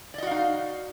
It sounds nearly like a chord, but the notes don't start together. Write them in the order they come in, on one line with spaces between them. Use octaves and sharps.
D5 D#5 F#4 F5 D#4